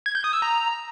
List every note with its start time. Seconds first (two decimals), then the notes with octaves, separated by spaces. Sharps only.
0.06 G#6
0.15 G6
0.24 D#6
0.33 E6
0.42 A#5